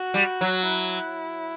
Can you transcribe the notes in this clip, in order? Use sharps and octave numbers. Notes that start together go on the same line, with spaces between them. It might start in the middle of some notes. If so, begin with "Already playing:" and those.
Already playing: F#4
G3
F#3
E4